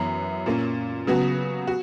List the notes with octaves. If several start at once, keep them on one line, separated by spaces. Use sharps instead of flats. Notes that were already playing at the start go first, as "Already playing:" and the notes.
Already playing: F#2 E3 B3 E4
A#2 A#3 C#4
C#3 F#3 B3 F#4
F#4